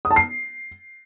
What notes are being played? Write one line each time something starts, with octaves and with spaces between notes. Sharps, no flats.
D#6
A5
C7